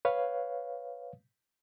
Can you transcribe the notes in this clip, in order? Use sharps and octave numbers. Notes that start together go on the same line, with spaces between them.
B4 C#5 F5